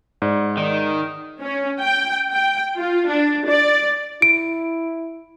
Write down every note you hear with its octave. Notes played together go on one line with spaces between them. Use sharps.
G#2 D5
D#3 D5
C#4
G5
G5
F4
D4
D5
E4 D7